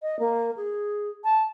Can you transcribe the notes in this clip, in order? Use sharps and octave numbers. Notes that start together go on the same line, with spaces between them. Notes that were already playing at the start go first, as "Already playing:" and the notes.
D#5
A#3
G#4
A5